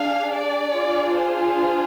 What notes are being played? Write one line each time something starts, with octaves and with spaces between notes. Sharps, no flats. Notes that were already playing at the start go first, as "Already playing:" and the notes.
Already playing: D4 G#4 F5
D5
D4 F4 G#4
C5